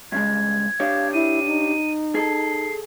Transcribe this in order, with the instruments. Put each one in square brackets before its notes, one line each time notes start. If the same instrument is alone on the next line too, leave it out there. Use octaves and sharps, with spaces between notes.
[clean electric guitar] G2 C#3 G#3 [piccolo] G#6
[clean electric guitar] D4 G4 C#5 [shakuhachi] F5
[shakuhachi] E4 [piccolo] D#7
[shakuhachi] D#4
[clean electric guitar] G#4 A4 [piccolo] C7